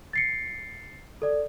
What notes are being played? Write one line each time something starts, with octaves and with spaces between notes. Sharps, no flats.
A6 C7 C#7
A4 D5